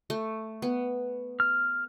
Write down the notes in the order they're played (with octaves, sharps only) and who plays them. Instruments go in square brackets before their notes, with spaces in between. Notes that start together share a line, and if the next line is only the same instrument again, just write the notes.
[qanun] A3
B3
[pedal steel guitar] F6